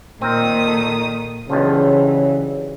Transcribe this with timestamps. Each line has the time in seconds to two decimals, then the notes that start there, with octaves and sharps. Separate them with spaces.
0.22 A#2 D#3 C4 A#4 D#6
0.67 A4
1.50 B1 G2 C#3 E3 F3